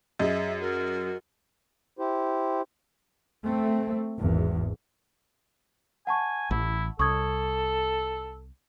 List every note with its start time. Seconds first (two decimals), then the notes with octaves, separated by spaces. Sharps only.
0.20 F#2 G#4 D#5 E5
0.61 F#4 A#4
1.99 E4 G4 C5
3.43 A3 C4
4.19 G#1 E2
6.07 F#5 G#5 A5 C#6
6.51 A1 E4
6.99 C2 A4 C#6 D#6 G#6